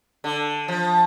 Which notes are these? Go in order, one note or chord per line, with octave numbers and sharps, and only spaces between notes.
D3
F3